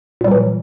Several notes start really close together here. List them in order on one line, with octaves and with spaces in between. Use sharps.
A#2 G3 F#3 E3